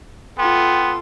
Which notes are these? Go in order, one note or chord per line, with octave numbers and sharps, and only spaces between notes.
B3 F4 A4 G5 C6